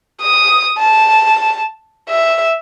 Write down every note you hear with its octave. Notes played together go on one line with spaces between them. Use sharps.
D#6
A5
E5